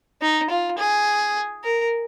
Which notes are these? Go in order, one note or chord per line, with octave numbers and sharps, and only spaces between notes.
D#4
F4
G#4
A#4